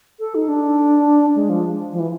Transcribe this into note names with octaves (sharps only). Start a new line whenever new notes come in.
A4
D#4
D4
G#3
F3
F3
E3